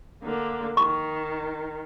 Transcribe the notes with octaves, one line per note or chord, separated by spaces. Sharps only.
D3 A#3
D#3 C#6